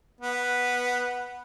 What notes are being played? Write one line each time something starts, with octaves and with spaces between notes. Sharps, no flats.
B3